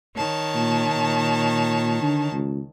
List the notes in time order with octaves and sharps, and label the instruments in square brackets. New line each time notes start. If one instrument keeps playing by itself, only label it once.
[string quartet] D#3 C#5 A5
[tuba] A#2
A#2
D3
C#2